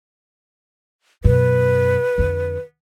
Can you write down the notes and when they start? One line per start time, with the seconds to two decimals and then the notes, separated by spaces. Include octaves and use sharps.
1.24 F#2 B2 B4
2.18 F2 D3